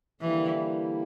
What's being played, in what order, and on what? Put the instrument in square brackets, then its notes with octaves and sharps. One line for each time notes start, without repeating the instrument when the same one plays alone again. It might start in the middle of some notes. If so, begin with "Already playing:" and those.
[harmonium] D3 G3 A#3 E4 G4 [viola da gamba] E3